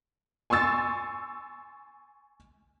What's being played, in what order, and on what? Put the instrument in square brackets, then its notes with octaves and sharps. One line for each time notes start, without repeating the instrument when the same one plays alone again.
[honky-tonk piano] G#5 C6 C#6 E6 A6